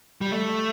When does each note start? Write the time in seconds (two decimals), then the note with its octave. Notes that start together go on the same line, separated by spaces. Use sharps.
0.21 G3
0.31 A3